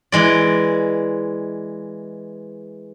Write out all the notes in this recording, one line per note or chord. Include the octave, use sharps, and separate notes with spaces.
E3 G#3 D5